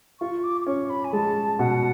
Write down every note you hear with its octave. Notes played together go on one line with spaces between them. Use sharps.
F4 C#6
D6
D6
C#4 C#6
B5
G#5
G#3 A5
B2 F#5